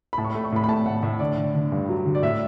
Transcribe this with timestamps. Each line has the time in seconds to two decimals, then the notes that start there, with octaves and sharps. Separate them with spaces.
0.13 B5
0.18 A2 A5
0.24 C#6
0.30 B5
0.34 A3
0.44 C#6
0.52 A2 B5
0.64 B5
0.68 A3 A5
0.86 A2 F#5
1.03 A2 E5
1.20 D3 D5
1.38 D3
1.55 D3
1.72 G2
1.89 F#3
2.06 D3
2.15 D5
2.22 A2 E5